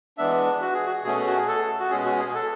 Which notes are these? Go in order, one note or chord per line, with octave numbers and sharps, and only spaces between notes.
E3 G#3 B3 D4 E5
F#4
G#4
F#4
B2 A3 C#4 G#4
F#4
G#4
A4
F#4
B2 G#3 C#4 G#4
F#4
G#4
A4